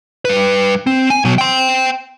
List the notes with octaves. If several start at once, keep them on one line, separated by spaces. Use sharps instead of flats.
G3 B4
C4
G#5
B2 F#3
G5 C6